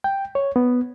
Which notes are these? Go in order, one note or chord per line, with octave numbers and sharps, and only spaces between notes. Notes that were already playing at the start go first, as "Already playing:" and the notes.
G5
C#5
B3